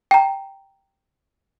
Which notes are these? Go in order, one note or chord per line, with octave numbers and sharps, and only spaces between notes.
G5 A#5